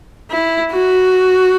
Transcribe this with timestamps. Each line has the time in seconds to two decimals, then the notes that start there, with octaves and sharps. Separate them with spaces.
0.31 E4
0.72 F#4